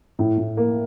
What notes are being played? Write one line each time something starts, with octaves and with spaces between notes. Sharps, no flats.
A2
A2
A#3